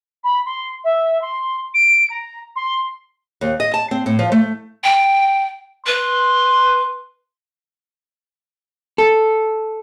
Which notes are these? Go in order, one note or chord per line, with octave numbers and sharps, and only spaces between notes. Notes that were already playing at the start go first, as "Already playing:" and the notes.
B5
C6
E5
C6
D7
A#5
C6
D#2
D#5
A5
C4
A2
F3
A3
G5
B4 C6
A4